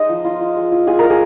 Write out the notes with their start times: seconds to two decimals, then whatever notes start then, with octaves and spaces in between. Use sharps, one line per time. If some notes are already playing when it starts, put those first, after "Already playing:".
Already playing: G#3 D#4 D#5
0.09 F3
0.25 F4
0.40 F4
0.56 G#3
0.72 F4
0.87 F4 G#4
0.99 F4 A#4
1.10 G#4